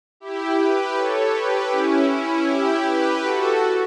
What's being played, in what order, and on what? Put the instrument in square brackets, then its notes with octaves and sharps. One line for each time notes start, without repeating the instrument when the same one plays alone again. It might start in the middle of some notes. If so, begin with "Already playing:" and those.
[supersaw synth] E4 G4
G4 B4
A4 C#5
G4 B4
C#4 E4
C#4 E4
E4 G4
G4 B4
F#4 A4